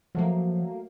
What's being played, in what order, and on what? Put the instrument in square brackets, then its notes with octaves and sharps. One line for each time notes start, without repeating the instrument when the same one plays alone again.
[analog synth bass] F3 [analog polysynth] F#3 A3 A#3